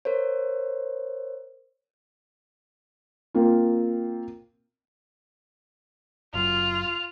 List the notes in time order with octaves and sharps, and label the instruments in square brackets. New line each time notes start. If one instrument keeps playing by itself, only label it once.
[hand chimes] A#4 C5 C#5
[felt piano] A#3 C4 F4
[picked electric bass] F#1 F#2 [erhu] F4 [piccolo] F7